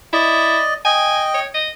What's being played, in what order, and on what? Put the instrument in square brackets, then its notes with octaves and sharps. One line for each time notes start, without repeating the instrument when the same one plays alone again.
[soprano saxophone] E4 [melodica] D5 D#5
[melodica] D#5 G5 [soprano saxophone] G#5
[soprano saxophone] C#5
D#5